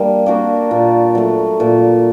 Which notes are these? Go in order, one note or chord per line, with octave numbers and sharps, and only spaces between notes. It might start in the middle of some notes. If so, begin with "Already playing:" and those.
Already playing: G3 A#3 D4
A#3 D4 F#4
A#2
F#3 A3
A#2